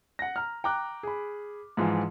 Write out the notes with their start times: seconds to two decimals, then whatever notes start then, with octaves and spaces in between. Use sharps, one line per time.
0.19 F#5 A#6
0.36 A#5 F6
0.64 G5 A#5 D6 F#6
1.03 G#4 B5
1.77 G#2 E3 F3 F4